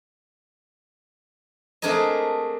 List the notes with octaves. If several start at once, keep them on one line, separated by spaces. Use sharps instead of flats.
A3 C4 D4 G#4 A#4 D#5